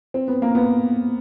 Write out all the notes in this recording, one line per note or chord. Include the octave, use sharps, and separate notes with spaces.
C4
B3
A#3
B3